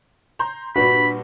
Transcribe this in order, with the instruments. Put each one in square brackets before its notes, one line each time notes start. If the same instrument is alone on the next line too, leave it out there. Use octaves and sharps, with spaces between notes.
[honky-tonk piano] A#5 C6 G6
[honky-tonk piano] G2 A#2 [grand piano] F#4 B4 [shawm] B5